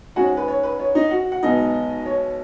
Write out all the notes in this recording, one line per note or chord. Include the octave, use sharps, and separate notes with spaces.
G#2 G#3 C#4 F#4 F#5
B4
C#5
B4
C#5
D#4 D#5
F#4 F#5
F#5
B1 B2 G#3 B3 D#4 D#5
C#5